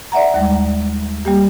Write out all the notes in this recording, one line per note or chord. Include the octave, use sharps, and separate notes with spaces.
D5 E5 F#5 A#5
D#2 G3 G#3
G3 A#3 G4